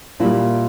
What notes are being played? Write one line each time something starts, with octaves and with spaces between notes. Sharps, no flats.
A#2 G3 E4